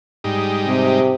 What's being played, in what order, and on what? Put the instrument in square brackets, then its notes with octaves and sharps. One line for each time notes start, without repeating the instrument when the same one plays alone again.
[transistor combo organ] G#2 G3 D#4
[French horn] C3